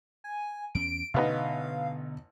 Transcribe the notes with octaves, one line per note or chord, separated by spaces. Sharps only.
G#5
E2 C#4 D7
A1 B2 D3 B3 D#4 F5